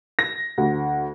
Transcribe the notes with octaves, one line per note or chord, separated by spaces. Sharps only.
A#6
D2